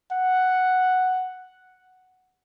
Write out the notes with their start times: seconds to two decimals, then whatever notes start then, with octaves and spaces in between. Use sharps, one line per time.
0.12 F#5